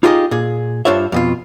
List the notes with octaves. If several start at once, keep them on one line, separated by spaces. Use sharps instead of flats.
D#4 F4 G4 G#4 C#5 D#5
A#2 G#4
G2 D4 F4 C5 C#5 E5
F2 B2 F4